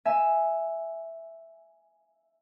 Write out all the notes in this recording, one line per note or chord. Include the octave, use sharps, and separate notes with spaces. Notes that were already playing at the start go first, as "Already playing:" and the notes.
E5 G#5